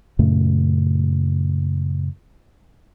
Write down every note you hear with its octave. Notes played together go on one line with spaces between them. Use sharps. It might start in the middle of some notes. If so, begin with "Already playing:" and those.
F#2 A#2 C#3 A3